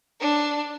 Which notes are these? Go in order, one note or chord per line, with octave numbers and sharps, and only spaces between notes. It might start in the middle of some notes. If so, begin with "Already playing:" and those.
D4